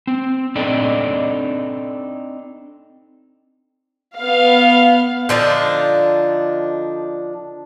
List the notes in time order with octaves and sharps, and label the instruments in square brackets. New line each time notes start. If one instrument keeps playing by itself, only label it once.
[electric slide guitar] C4
C4 D4 D#4 A4 D5
[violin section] B3 F5
[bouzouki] D3 F3 D4 D#4